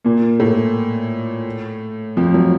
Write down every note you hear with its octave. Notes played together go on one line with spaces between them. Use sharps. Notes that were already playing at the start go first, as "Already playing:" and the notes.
A#2 A#3
A2 A3
F2 F3
F#3